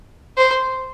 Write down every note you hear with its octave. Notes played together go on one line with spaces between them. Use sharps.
C5